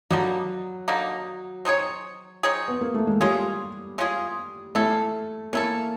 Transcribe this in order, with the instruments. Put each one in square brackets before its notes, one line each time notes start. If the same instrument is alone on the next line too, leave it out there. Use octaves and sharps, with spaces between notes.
[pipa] D3 G3 A#3 D#4 [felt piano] F#3
[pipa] D3 G3 A#3 D#4
C4 D#4 G#4 C#5
C4 D#4 G#4 C#5
[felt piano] B3
A#3
A3
G#3
[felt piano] G3 [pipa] G#3 C#4 F4 G#4
[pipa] G#3 C#4 F4 G#4
[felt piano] A3 [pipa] C#4 E4 A4
[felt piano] A#3 [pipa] C#4 E4 A4